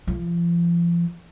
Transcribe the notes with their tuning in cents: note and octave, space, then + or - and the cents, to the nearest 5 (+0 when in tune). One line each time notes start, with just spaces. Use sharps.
F3 -35